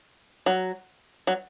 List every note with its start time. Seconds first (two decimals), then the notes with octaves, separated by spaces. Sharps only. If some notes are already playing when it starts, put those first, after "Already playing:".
0.46 F#3
1.27 F#3